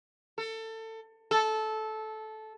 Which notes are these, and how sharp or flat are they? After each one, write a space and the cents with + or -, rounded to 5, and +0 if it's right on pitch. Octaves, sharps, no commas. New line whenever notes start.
A4 +25
A4 -15